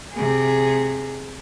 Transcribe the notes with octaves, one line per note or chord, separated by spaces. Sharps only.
C3 G#4